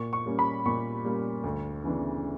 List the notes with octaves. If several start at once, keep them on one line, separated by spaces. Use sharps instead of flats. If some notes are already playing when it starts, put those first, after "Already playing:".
Already playing: A#2 C#6
C#6
G3 A#3 C#4
B5
A#2 C#6
G3 A#3 C#4
D2
C#3 E3 B3 D4